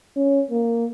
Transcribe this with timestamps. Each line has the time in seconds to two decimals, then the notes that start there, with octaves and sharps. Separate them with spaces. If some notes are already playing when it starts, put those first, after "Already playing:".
0.16 C#4
0.51 A#3